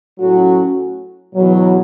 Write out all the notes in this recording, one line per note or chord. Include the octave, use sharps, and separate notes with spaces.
A2 F#3 C#4 F#4
E2 B2 F#3